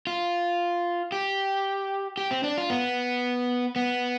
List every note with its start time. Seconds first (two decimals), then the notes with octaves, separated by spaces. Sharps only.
0.07 F4
1.12 G4
2.17 G4
2.31 C4
2.43 D4
2.58 F4
2.70 B3
3.76 B3